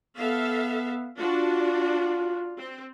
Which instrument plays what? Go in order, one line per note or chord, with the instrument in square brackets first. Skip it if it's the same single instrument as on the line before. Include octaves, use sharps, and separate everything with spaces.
[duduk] B3 [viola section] A4 E5 F5
[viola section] D4 F#4 [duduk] F4
[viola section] C4